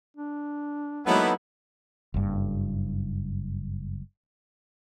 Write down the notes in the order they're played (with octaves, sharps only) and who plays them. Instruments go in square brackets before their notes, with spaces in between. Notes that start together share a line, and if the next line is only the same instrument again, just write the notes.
[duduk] D4
[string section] F#3 G#3 A#3 [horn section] B3 E4 [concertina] D#4 A4 B4
[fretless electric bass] F#1 G2